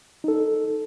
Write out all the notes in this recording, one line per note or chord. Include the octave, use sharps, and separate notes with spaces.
D#4 A4